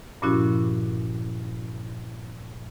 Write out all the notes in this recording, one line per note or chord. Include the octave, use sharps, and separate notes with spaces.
G2 A#2 F3 C#4 E4 F#4